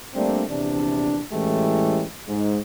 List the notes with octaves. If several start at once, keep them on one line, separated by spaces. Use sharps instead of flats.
G3 A3 A#3 C4 D4
A#1 E2 C3 D4
A2 E3 G#3 A3 C#4 G4
G#2 G#3